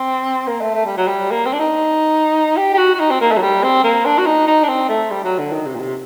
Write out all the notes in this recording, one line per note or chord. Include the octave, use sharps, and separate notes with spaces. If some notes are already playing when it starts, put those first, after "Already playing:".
Already playing: C4
A#3
A3
A3
G3
F#3
G3
A#3
C4
D4
D#4
G4
G4
F#4
F#4
D#4
C4
A#3
A3
F#3
G3
C4
A#3
D4
F#4
D#4
D#4
D4
C4
A3
G3
F#3
D3
D#3
C3
A#2
C3